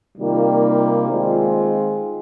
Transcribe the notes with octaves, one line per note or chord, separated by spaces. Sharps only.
C3 D#3 G3 A#3 F4
D#3 G#3 C4 F4